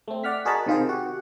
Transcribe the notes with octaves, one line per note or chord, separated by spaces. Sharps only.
A3 C4
D5 F#5 F6 B6
F#4 G#4 A#4 D#5 A5 B5
C3 D#3 F4 G#4 C5
F#4 G4 F#5